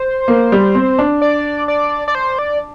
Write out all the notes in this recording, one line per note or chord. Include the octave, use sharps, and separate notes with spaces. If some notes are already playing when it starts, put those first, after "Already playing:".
Already playing: C5
A#3
G3
C4
D4
D5
D5
D5
C5
D5